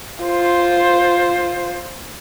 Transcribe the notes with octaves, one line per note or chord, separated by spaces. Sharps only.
F4 C5